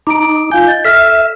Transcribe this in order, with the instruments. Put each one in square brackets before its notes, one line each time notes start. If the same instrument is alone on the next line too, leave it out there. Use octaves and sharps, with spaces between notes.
[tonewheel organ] D#4 [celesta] D6 D7
[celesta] F4 F5 G#5 [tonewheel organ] G6
[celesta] D#5 A6
[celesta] A4 E6 F6 [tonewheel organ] E5